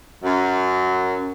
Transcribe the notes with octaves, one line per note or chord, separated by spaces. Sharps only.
F#2